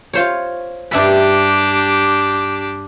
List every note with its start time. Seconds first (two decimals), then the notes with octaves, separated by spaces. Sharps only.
0.13 F4 C5 C#5
0.91 G2 D4 G4 E5 B5